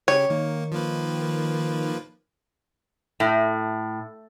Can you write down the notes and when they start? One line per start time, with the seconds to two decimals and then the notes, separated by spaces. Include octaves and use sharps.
0.08 C#3 G4 C#5
0.30 D#3 A#3
0.72 F3 A#3 B4
3.20 A2